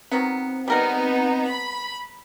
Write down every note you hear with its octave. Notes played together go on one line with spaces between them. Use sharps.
D#3 F#3 B3 C4
G3 B3 D#4 A#4 F#5
B5